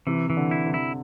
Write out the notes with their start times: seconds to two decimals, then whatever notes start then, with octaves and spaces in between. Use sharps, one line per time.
0.07 C3 E3
0.30 E3
0.37 D3
0.51 E4
0.66 C3
0.74 E4